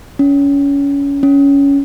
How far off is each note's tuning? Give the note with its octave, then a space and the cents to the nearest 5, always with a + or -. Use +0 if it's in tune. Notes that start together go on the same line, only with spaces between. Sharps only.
C#4 +25
C#4 +15